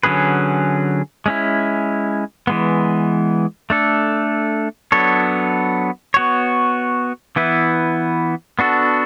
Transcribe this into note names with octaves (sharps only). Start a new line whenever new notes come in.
D3 F#3 C#4 G#4 B4
G#3 C#4 E4
E3 G#3 B3
A3 D4 A4
F#3 B3 D4 A4 C#5
B3 F#4 C#5
E3 B3 E4 B4
B3 D4 F#4 A4